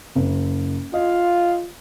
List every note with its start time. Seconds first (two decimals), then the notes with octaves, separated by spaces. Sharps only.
0.15 F#1
0.94 F4 D#5 F5